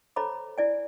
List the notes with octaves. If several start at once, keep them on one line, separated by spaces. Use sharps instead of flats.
A4 C5 C#5 A#5 B5 D6
E4 D5 G#5